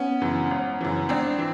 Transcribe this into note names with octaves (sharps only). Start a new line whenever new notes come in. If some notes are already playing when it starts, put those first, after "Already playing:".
Already playing: B3 C#4
F#2 C#3 E3
G#1
F#2 C#3 E3
G#1 C4 D4
E3